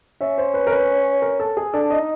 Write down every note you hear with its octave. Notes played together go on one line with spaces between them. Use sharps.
C#4 E5
C5
B4
A#4
B4
A#4
A4
G#4
D4 A4
D#5
D#4